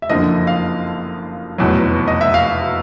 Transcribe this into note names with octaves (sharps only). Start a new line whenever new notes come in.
E5
F#1 F2 D3 F3 D#5
F5
F1 E2 B2 F#3
D#5
E5
F5